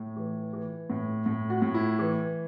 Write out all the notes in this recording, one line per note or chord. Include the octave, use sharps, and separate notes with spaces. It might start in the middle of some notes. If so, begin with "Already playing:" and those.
Already playing: A2
E3
E3
A2
A2
F#4
A2
E4
E3